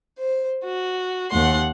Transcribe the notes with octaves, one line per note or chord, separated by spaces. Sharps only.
C5
F#4
D#2 F#5 C6